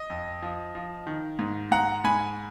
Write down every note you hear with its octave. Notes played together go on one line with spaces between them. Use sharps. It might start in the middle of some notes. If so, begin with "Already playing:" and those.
Already playing: D#5
F2
F3
F3
D#3
G#2
G#2 F#5 A#5
G#2 G#5 B5